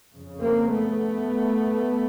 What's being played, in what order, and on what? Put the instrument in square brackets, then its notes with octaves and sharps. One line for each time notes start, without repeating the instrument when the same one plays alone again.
[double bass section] F2 C#3
A#3 C4
A3 B3